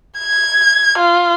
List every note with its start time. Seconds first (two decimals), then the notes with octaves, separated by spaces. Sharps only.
0.19 G#6
0.98 F4